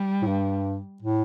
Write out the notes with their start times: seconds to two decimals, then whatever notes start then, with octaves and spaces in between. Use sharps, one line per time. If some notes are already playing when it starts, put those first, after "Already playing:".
Already playing: G3
0.22 A2
0.28 G2
1.03 A2